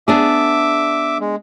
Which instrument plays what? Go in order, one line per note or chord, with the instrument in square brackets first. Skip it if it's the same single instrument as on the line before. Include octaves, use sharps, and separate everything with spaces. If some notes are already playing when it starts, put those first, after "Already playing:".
[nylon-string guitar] B3 D4 G#4 [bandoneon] E5 D6
[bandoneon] G#3